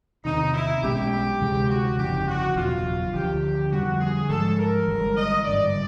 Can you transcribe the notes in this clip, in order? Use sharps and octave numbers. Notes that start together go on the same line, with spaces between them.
E2 C3 D#3 D#4
E4
B1 B2 G#3 C#4 G4
D2 C3 E3 G#3
F#4
G1 F2 C#3 E3 G4
F#4
F#1 E2 B2 F#3 F4
D2 D3 F3 G4
F2 D3 G3 F#4
G#4
G#2 F3 G#3 A4
A#4
G1 G2 E3 G#3
D#5
G#1 G2 D3 D5